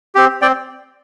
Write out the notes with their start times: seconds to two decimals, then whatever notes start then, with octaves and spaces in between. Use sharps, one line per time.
0.15 C4 G4
0.42 C4 D5 G5